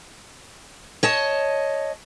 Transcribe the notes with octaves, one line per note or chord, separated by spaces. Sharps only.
C#5 D#5 A5